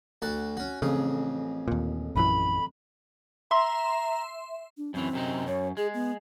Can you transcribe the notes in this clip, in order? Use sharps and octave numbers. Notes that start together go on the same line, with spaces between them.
D2 F#4 A5
C#4 F#4
A1 F2 C#3 G#4
D#2 A#2
A#1 F#2 E3 B5
E5 A#5 C6
D4
F#2 E3 C4
F#2 C3 D#4
F#2 C#5
G#3 G#4
B3